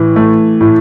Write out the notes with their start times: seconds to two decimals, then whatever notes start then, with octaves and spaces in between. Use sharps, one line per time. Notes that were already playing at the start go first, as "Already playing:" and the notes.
Already playing: A2 E3
0.16 A3
0.61 A2